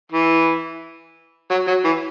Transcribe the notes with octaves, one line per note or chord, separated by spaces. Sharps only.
E3
F#3
F#3
E3